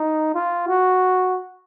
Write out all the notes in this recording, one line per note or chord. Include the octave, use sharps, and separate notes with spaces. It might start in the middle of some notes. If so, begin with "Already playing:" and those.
Already playing: D#4
F4
F#4